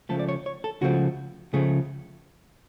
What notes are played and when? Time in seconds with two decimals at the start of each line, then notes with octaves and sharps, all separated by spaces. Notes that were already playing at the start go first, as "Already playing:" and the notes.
0.09 C#2 C#3 F3 A3 A4
0.19 D5
0.28 C#5
0.46 C#5
0.64 A4
0.81 C#2 C#3 F3 A3 F#4
1.53 C#2 C#3 F3 A3 G#4